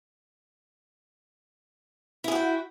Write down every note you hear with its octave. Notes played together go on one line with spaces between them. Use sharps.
E4 F#4 G#4 G5